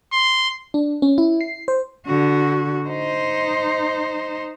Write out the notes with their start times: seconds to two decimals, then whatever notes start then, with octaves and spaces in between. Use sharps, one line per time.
0.13 C6
0.74 D4
1.02 C#4
1.18 E4
1.41 C7
1.68 C5
2.06 D3 F#4
2.89 D#4 C5